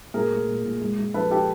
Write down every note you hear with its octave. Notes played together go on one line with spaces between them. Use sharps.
A#2 G#4 A#4
A3
A#2
A#2
G#3
G#3
F3 A4 B4
G4 A4